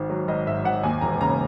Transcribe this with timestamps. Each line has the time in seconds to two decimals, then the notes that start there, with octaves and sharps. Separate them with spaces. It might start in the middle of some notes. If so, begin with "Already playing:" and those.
Already playing: G#1 G#2
0.10 F#3
0.28 G#1 D#5
0.47 G#2 E5
0.64 G#1 F#5
0.83 D#2 G#5
1.01 E1 A#5
1.20 C#3 A#5